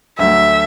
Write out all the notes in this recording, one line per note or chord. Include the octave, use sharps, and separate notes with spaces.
D2 D3 F#3 A3 E5